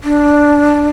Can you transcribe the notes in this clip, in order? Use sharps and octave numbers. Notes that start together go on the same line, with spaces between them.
D4